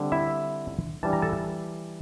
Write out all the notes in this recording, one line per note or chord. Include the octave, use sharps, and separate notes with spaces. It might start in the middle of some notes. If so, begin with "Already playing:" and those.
Already playing: D3 G3 C4
E4 E5
E3 G3 D4 A5
A#5
A4 A5